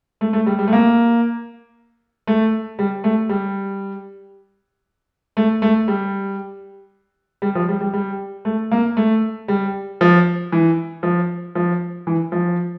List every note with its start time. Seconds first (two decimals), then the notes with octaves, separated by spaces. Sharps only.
0.21 A3
0.33 A3
0.46 G3
0.59 G3
0.68 A3
0.73 A#3
2.27 A3
2.79 G3
3.04 A3
3.29 G3
5.37 A3
5.62 A3
5.88 G3
7.42 G3
7.55 F3
7.69 G3
7.81 G3
7.93 G3
8.45 A3
8.72 A#3
8.97 A3
9.48 G3
10.01 F3
10.52 E3
11.03 F3
11.55 F3
12.07 E3
12.32 F3